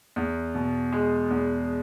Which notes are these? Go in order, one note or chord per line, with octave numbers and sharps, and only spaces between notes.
E2
B2
G#3
E2